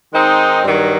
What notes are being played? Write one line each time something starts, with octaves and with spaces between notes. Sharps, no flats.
D#3 G#3 C4 D#4
G2 D#3 F#3